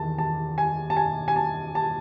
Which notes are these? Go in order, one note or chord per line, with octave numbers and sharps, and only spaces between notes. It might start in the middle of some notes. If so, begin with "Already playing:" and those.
Already playing: E2 D#3 A5
A5
G#5
A5
G#5
G#5
A5
A5